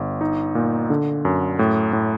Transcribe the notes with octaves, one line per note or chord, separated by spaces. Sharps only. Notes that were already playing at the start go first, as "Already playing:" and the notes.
Already playing: G1
D#4
A#2
D3
F#2
A2
A2